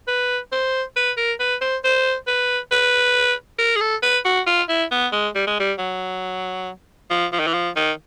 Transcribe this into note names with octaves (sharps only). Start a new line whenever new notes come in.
B4
C5
B4
A#4
B4
C5
C5
B4
B4
A#4
G#4
A4
B4
F#4
F4
E4
B3
G#3
G3
G#3
G3
F#3
F3
F3
D#3
E3
F3
D#3